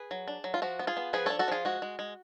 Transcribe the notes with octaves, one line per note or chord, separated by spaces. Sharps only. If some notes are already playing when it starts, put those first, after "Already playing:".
Already playing: G#4 B4
F#3
D4
F#3
F4
F3 F#4
B3
F4 G#4
B3
F3 G#4 B4
D4 A4 C#5
F#4 A4
F3 F4 G#4
G#3 F#4
G#3
G#3